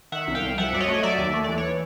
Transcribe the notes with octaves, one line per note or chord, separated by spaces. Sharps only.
D#3 E5 F#5
C2
F5 G5
C2
F3 E5 F#5
F#2 D5
C#5 D#5
A3
D#5
F#3 D5 E5
D#2
A3
E3 D5
C#5